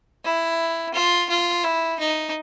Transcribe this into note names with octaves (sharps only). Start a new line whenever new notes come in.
E4
F4
F4
E4
D#4